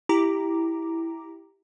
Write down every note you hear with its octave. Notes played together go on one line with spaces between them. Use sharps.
E4 G4 A#5 D6